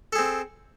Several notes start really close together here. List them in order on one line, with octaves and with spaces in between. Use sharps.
A4 G#4 C4